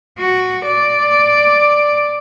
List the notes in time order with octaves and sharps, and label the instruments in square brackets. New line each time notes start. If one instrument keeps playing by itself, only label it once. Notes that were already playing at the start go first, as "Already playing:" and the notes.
[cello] F#4
D5